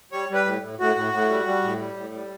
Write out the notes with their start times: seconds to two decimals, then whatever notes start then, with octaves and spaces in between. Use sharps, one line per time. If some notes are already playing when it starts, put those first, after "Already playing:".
0.12 G3 C#5
0.29 G3 B4
0.46 A2
0.62 A2
0.79 A2 F#4
0.96 A2
1.13 A2
1.29 G3
1.47 G3
1.63 A2
1.79 G3
1.96 A2
2.13 G3